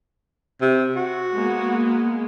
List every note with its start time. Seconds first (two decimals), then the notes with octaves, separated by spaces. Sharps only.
0.61 C3
0.96 F#4
1.32 G#3 A#3 B3